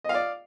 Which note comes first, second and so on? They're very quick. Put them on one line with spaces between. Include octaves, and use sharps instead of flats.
D#5 F5 D5